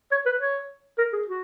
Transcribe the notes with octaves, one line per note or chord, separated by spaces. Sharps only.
C#5
B4
C#5
A#4
G#4
F#4